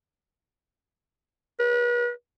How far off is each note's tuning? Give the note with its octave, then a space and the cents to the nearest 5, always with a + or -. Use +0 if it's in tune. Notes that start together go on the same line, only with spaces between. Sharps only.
B4 -40